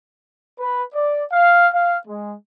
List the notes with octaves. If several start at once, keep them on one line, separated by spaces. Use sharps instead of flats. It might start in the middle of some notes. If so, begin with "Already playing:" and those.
B4
D5
F5
F5
G#3